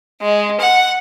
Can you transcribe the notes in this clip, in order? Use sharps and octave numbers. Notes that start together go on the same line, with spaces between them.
G#3
F#5